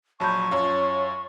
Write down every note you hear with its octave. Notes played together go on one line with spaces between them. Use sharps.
A#1 F#3 A5 B5 C#6 G6
F#2 F4 C#5